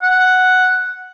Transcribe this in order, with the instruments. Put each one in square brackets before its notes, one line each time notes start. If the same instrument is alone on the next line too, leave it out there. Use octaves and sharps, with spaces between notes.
[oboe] F#5